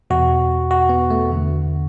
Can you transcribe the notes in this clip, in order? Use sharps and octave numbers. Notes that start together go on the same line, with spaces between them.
E2 B2 F#4
F#4
B3
A3
E2 D3